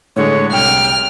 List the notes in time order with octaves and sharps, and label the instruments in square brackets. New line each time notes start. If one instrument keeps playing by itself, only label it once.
[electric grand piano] A2 D3 G#3 [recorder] C#5
[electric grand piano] C2 [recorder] G5 [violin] F6